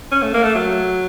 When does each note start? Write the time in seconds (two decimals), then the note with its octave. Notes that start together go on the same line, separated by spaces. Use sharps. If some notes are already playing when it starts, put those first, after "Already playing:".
0.12 C#4
0.22 A3
0.34 A#3
0.43 A3
0.55 F#3